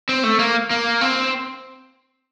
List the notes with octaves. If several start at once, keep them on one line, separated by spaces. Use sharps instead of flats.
C4
A3
A#3
A#3
C4